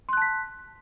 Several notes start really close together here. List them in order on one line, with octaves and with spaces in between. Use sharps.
C6 F#6 A5 B6